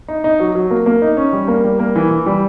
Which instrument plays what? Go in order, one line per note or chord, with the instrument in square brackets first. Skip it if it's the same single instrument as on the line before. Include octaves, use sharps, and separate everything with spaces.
[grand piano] D#4
D#4
F#3
F#3
A#3
A#3
D#4
C#4
G3
A#3
G3
A#3
E3
E3
G3